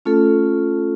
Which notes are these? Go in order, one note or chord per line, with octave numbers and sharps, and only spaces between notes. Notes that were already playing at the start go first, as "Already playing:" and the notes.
A3 C#4 F4 A4